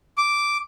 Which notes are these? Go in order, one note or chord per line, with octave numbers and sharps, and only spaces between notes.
D6